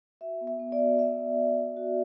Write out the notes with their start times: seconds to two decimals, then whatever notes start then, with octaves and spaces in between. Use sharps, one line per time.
0.21 F#4 E5
0.41 B3
0.47 E5
0.60 B3
0.72 D5
0.80 F#4
0.99 F#4 E5
1.18 B3
1.38 B3
1.57 F#4
1.77 F#4